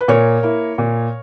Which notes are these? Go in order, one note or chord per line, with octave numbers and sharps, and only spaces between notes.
B4
A#2 A#4 C#5
A#3 E4
A#2